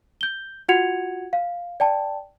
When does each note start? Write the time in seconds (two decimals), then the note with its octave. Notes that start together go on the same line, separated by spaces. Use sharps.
0.21 G6 G7
0.69 F4 F#4 F#5 G#6 C#7 F7
1.33 F5
1.80 D5 G5 A5